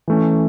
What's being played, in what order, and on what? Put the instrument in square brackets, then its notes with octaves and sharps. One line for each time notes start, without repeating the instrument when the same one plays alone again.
[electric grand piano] E3 A3 C#4